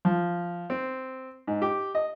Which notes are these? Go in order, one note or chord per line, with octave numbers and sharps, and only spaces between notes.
F3
C4
G#2
G4
D#5